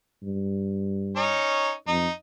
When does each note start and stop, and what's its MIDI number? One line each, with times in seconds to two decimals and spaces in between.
0.23 1.41 43
1.16 1.72 61
1.16 1.72 63
1.16 1.72 73
1.88 2.07 41
1.88 2.12 63